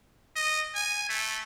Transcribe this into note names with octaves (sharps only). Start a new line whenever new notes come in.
D#5
G#5
A3